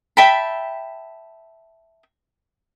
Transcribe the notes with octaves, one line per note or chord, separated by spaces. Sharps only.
E5 G5 A5 B5